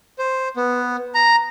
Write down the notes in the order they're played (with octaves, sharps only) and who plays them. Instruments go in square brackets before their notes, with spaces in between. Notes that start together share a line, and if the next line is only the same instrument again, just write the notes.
[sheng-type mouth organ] C5
B3
A#5